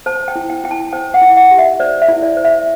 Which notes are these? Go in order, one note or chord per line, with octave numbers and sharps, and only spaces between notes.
C5 A5
G5
E4
G5
E4 G5
A5
C5 G5
F#5
E4
F#5
G4
E5
C5 D5
E5
E4
D5
C5
E5